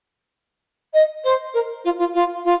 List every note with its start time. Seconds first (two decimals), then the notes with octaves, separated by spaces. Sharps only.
0.93 D#5
1.24 C5
1.54 A#4
1.84 F4
1.98 F4
2.14 F4
2.45 F4